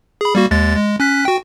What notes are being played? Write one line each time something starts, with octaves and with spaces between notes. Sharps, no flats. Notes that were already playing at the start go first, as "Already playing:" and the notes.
G#4 B5
G3 A#3 F#4
D#2 G#3 A6
G#3
C#4 F#6 B6
F#4 G5